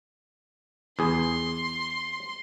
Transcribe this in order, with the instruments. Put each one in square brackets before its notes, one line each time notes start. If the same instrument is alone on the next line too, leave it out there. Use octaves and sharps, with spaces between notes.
[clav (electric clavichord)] E2 G#4 [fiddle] C6